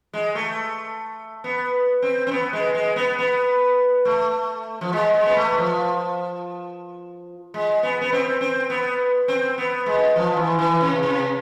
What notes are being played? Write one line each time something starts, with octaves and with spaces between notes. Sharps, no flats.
G#3
A3
B3
C4
C4
B3
G#3
G#3
B3
B3
A3
F3
G#3
G#3
B3
A3
F3
G#3
B3
B3
C4
C4
B3
C4
B3
G#3
F3
E3
E3
C3
C3